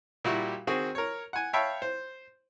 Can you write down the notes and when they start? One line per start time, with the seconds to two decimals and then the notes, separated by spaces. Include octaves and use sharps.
0.24 A#2 G3 E4 F#4 G4
0.67 D#3 C4 F#4 G#4
0.95 A#4 C#5
1.33 F#5 G#5
1.53 C#5 E5 F5 G5 A5 B5
1.82 C5